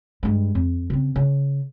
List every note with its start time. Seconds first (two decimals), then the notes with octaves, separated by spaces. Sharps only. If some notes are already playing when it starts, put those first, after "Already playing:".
0.23 G2 G#3
0.55 F2
0.90 C#3 C4
1.16 C#3